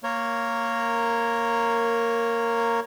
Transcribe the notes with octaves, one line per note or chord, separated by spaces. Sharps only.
A#3 A#4 C#5